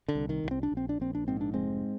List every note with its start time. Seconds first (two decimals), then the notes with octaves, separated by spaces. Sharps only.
0.08 D3
0.15 C2
0.29 D#3
0.44 C2
0.51 C4
0.63 D4
0.72 A#1
0.77 C4
0.89 D4
1.00 A#1 C4
1.15 D4
1.28 G#2 C4
1.41 D4
1.54 F1 G#3 C4